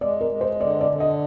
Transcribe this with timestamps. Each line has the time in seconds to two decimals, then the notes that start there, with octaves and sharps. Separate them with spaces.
0.01 G#3 D5
0.21 A#4
0.31 G#3
0.41 C5
0.61 D3 D5
0.81 D5
0.91 D3
1.00 D#5